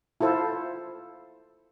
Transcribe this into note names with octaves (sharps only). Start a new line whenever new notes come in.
E4 F4 A4 C5